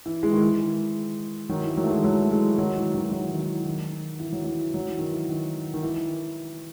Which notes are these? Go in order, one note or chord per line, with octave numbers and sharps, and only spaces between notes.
E3
E3 G#3
D#3
E3
D#3 F#3
E3
D#3 F#3
A3
E3 G#3
F#3 A3
A3
E3 G#3
D#3 F#3
E3
D#3 F#3
F#3
E3
D#3
E3
D#3
E3
F#3
E3
F#3
E3
D#3
E3
D#3
D#3
E3